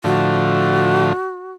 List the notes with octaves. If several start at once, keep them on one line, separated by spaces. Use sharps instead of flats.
A2 D3 F3 F#4